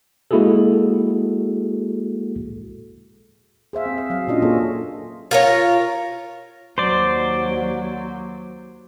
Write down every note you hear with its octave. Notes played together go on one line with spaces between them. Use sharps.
G#3 A#3 E4 F#4 G#4 A4
G#4 C5 E5 F5
C4
E5
F#3 F5
A#2 C#4 D4 F4 D#5
A#3 G#4 A4 C#5 D#5
F4 A#4 C#5
D#2 F#3 C5 D5